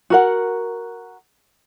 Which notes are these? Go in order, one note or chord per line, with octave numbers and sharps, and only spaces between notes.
F#4 A#4 F#5